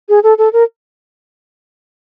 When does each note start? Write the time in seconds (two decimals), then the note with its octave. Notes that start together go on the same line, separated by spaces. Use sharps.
0.09 G#4
0.23 A4
0.38 A4
0.53 A#4